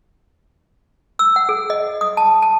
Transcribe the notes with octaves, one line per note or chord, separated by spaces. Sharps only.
E6
F#5
G#4
D#5
D#6
A5
A5